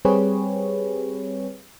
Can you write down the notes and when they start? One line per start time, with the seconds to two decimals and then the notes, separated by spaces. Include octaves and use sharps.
0.05 G3 C4 G4 G#4 B4 C#5